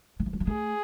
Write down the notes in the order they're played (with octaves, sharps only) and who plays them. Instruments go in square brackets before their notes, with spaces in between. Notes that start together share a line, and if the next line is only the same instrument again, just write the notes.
[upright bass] D#3
E3
F#3
G#3
[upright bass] A3 [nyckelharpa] G#4